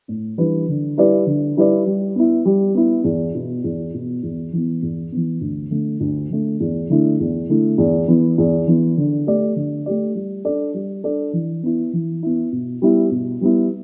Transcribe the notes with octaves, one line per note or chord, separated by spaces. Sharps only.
A2
E3 G3 D4 B4
D3
G3 E4 B4 D5
D3
G3 E4 B4 D5
G3
B3 E4
G3
B3 E4
E2
B2 B3
E2
B2 B3
E2
E3
B3
E2
E3 B3
D2
D3 A3
D2
D3 A3
E2
D3 A3 E4
E2
D3 A3 E4
E2
E3 B3
E2
E3 B3
D3
A3 G4 D5
D3
A3 G4 D5
G3
D4 A4 D5
G3
D4 A4 D5
E3
B3 E4
E3
B3 E4
B2
G3 B3 E4
B2
G3 B3 E4